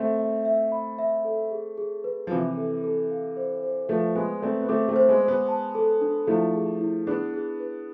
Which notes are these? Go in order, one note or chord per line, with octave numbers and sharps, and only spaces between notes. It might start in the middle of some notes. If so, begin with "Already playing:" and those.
Already playing: A3 C4 E5
E5
E5
B5
E5
A4
G#4
G#4
B4
F3
C3 E3 E4
A4
A4
F5
C5
C5
F3 A3 B4
G#3 B3 B4
A3 C4 D5
B3
A3 C4 D6
A3 C4
C5
G#3 B3
C5
G#3 B3
A5
A4
D4
F3 A3 E4
G#4
E4
B3 D4 G#4
G#4
B4